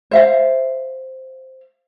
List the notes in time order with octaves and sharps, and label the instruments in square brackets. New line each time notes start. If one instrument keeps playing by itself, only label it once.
[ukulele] C5 E5 F5